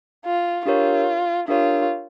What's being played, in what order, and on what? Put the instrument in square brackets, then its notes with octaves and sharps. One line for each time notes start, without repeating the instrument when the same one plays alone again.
[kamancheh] F4
[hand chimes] D4 G4 A#4 C#5 [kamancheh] F4
[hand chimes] D4 G4 A#4 C#5 [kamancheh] F4